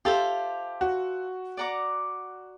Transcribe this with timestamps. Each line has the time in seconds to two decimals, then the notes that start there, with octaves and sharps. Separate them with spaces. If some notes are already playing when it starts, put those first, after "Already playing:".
0.05 F4 G4 A4 C5 E5
0.81 F#4
1.57 D5 F#5 A#5 D6